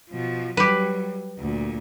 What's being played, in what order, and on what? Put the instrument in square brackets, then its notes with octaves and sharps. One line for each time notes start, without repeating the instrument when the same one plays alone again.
[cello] B2 F3
[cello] F#3 G3 [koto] G4 B4
[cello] D2 A#2